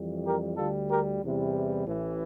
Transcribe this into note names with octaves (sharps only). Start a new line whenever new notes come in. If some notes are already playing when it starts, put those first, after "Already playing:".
Already playing: F2 E3 G3
G4 A#4
D2 D3 G3 F4 A4
G4 A#4
E2 C3 E3 G3
A1 A2 E3